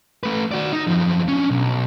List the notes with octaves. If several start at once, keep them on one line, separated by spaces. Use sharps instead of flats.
A3 B4
F#4 D5
D#4
F#2 F3
C#4 D4
B1